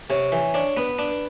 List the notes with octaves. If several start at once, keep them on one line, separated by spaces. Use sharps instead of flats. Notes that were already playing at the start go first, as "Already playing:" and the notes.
C3 C#5
E3
D4 C#5
B3 B4
D4